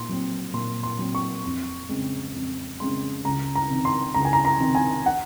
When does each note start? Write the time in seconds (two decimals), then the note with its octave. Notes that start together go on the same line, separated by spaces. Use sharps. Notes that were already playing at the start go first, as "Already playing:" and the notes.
Already playing: A#2 C6
0.09 F#3 C4
0.53 A#2 C6
0.83 C6
0.99 F#3 C4
1.15 C#6
1.45 F2
1.89 C#3 G#3 C4
2.35 F2
2.80 C#3 G#3 C4 C6
3.25 C#2 A#5
3.55 A#5
3.70 C3 D#3
3.85 C6
4.14 C#2 A#5
4.25 G#5
4.33 A#5
4.45 A#5
4.60 C3 D#3
4.75 G#5
5.06 F#5